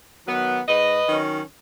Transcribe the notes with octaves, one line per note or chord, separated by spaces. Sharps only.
D#3 F#3 B3
G#2 B4 D#5
D#3 F#3 C#4